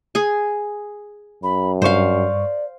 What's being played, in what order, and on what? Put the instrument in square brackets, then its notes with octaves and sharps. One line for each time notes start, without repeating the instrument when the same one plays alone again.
[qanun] G#4 G#5
[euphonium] F#2 [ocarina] B5
[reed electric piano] G2 C#6 [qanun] C5 F5 [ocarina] D5